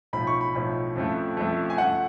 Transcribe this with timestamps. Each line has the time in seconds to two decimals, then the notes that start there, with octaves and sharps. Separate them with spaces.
0.13 B1 A2 F3 B5
0.27 C#6
0.41 B5
0.54 B1 A2 F3
0.96 F2 C#3 F3 A3
1.37 F2 C#3 F3 A3
1.70 G#5
1.78 F#2 F3 A3 F#5